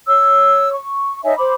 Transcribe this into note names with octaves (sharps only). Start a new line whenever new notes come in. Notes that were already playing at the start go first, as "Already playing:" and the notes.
C#5 E6
C#6
D#4 C#5 E5 G#5
C5 B5 D6